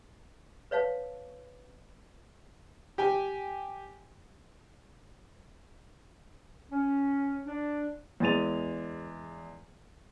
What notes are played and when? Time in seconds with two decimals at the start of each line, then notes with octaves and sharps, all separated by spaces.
0.71 B4 C#5 F5 A5
2.98 G4 G5 G#5
6.70 C#4
7.47 D4
8.20 E2 G#3 G#5 A6 D#7 F7